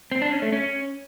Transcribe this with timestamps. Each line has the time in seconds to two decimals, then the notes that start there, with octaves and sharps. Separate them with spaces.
0.12 C4
0.22 D4
0.32 C#4
0.42 A3
0.52 C#4